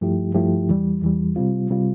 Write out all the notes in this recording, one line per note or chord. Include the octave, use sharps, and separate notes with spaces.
G2 F3 A3 E4 G4
G2 F3 A3 E4 G4
E2 E3 G3
E2 E3 G3
C3 G3 C4 F4
C3 G3 C4 F4